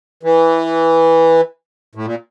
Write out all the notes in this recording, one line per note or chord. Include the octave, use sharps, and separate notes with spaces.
E3
A2
A#2